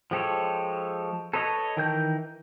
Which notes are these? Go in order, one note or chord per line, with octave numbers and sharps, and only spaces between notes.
F3 G#3 G4 A4 C#5
A4 B4 C#5 D#5
D#3 E3 A#4 G5 G6